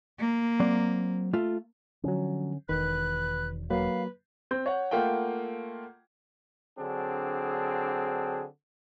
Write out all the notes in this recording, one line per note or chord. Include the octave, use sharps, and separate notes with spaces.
A#3
F#3 C4 D5
A3 F4
D3 F3 F#3 C#4
E1 D#3 B4 F#6
F#3 A#3 B4 F5
C4 G6
C#5 F#5
A3 A#3 F4 F#5 G5
D3 F#3 C4 D4 G#4